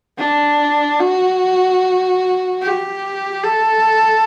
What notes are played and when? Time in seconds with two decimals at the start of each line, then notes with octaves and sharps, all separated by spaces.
0.19 D4
1.00 F#4
2.62 G4
3.43 A4